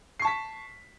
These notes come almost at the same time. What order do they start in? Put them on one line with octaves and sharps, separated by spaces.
C7 C#6 A5 B6